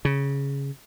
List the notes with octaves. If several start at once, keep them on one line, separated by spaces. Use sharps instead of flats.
C#3